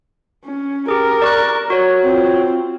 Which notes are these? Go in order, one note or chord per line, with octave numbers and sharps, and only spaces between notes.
C#4
G4 G#4 A#4
D5 C#6 F#6
F#4 C#5
C4 F4